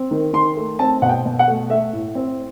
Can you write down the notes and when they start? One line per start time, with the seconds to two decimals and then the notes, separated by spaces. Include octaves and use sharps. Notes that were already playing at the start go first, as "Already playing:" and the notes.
Already playing: C4
0.11 D#3
0.33 D#3 C6
0.57 A3
0.79 C4 A5
1.02 B2 F#5
1.09 G5
1.25 B2
1.39 F#5
1.48 A3
1.70 A3 E5
1.93 A2
2.15 C4